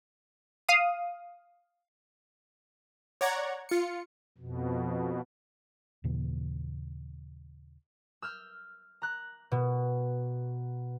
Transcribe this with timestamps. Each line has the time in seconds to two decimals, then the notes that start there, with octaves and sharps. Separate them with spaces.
0.69 F5 D#6
3.21 C#5 D5 F#5 A#5 G#6
3.69 F4 C#7
4.38 F2 B2
6.04 D#2 A#2 C#3 E3
8.22 E6 F6 G6
9.02 A#5 F#6
9.52 B2